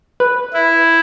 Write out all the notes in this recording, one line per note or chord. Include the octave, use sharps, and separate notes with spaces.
B4
E4